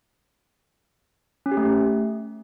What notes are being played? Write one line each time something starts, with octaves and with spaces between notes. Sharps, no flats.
C#4
G4
A3